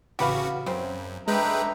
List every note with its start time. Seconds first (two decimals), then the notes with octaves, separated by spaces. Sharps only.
0.19 A1 C#3 F#4 G4 B4 F5
0.66 F#2 C#3 C4
1.28 D3 G#3 B4 E5 G5 A#5